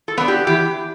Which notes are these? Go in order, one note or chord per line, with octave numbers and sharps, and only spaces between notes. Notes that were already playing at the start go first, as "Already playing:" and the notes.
A4
B3 D4
G4
E3 G4